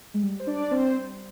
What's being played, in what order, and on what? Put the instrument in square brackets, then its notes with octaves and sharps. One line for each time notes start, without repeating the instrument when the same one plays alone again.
[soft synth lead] G#3
G3
[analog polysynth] C5
D4 D5
C4 C5